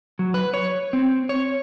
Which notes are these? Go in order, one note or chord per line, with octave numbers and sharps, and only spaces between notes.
F#3
B4
C#5
C4
C#5